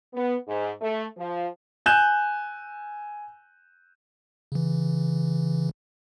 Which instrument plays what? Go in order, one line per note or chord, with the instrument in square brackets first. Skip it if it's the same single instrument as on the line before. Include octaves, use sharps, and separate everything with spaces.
[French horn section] B3
G#2
A3
F3
[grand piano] G#5 F#6 G6 E7
[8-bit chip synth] C#3 E3